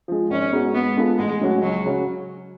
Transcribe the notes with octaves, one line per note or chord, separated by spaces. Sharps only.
F3 G#3
G#1 C#4
G#2 G#3 B3 F#4
G#2 B3
G#3 B3 F4 A4
A1 G#3
A2 F#3 C#4 F#4
C#2 F#3
C#3 F#3 C#4 F#4